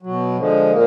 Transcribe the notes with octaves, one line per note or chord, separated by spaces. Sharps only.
B2 F#3
D3 F3 G#3
A#2 A#3